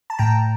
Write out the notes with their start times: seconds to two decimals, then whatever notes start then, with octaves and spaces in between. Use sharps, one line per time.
0.10 A5
0.19 A2 G5 A#5